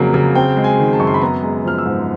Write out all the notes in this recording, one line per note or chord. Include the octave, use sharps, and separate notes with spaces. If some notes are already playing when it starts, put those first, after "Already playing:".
Already playing: F2 C#3 F#3 A#3
C#3
C4 G5
G#3
G#5
D#3
A5
F#2 C#6
C6
B5
B3 A#5
G#3
F3 F6
E6
G#2